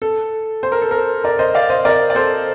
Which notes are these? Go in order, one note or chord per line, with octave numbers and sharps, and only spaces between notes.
A4
C5
A#4
A4
A#4
A#4 D5
C5 D#5
D5 F5
C5 D#5
A#4 D5
D5
A4 C5